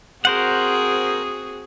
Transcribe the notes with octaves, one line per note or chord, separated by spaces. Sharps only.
C4 F#4 G#4 A#4 C5 F#5